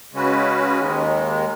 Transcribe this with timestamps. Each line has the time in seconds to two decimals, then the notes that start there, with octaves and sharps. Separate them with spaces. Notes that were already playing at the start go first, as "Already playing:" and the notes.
0.13 C#3 G#3 C#4 F#4 B4
0.80 D#2 D#3 G#3